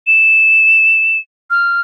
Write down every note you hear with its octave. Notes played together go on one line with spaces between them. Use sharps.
E7
F6